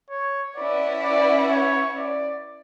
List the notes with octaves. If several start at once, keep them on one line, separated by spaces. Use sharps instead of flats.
C#5
C#4 E4 B4 D5 F#5
D5
C#5
D5